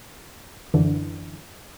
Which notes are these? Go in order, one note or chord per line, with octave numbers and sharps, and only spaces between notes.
F#2 D3 E3